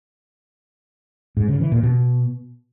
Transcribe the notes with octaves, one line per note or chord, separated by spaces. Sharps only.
G#2
C#3
E3
A#2
B2